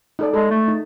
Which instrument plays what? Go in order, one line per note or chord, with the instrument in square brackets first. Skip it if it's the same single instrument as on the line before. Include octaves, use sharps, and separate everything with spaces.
[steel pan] D#4 A4 D5
[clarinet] G#3 [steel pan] A4
[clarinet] A3
[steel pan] D#4